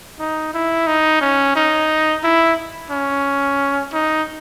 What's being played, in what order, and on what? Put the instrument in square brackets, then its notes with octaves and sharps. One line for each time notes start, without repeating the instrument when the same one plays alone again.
[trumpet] D#4
E4
D#4
C#4
D#4
E4
C#4
D#4